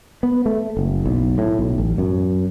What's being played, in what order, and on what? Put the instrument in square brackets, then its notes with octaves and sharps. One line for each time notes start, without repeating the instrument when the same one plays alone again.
[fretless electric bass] B3
A3
F#1
B1
A2
B1
A1
F#2